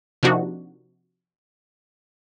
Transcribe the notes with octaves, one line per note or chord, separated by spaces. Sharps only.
C3 F3 A#3 D4 D#4 F#4